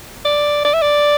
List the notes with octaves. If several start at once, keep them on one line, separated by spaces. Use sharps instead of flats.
D5
D5
E5
D5